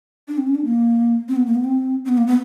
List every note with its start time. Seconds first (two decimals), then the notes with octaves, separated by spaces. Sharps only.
0.28 D4
0.38 C4
0.47 C#4
0.55 D4
0.65 A#3
1.29 C4
1.36 B3
1.47 A#3
1.55 B3
1.64 C4
2.05 C4
2.09 B3
2.18 A#3
2.27 B3